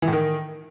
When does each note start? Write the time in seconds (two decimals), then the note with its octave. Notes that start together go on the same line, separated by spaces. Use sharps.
0.02 E3
0.07 A2
0.13 D#3